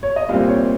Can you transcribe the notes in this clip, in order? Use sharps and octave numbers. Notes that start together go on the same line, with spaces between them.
C#5
D#5
C2 A#2 G3 C4 F5
C#5